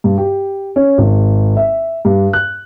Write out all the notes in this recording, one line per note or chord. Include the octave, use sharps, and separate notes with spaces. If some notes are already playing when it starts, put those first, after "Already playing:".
G2
G4
C#4
G#1
E5
G2
F#6